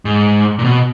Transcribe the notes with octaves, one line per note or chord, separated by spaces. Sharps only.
G#2
A#2
B2